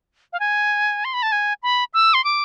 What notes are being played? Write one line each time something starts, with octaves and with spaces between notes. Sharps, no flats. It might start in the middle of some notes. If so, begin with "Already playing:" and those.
F5
G#5
C6
B5
A5
G#5
B5
E6
C6
D6